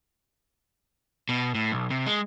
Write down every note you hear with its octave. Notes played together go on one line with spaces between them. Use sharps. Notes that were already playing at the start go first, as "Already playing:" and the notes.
B2
A2
B1
C3
G#3